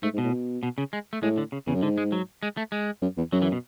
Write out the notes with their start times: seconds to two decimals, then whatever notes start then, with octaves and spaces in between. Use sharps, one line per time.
0.03 G#2 A3
0.13 G#2
0.18 B2
0.23 A2
0.32 B2
0.63 B2
0.78 C#3
0.93 G#3
1.13 A3
1.22 A2 G#3
1.38 D3
1.52 C#3
1.66 E2 C#3
1.74 F#2
1.83 G#2 D3
1.98 G#3
2.12 F#3
2.43 G#3
2.57 A3
2.72 G#3
3.02 F#2
3.17 E2
3.32 F#2 F#3
3.42 E3
3.52 B2